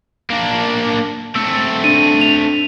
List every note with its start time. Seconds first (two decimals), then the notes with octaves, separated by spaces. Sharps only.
0.30 A#3 D4
0.51 A5
1.35 A3 C4 E6
1.84 D4 D#7
2.21 F7